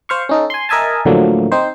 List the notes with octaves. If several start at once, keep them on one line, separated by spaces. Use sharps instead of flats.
C5 F5 C#6
C#4 D#4 A4
G#5 C6
A#4 D#5 E5 G#5 A5
A2 D3 F3 F#3 A3 A#3
C4 D#4 C5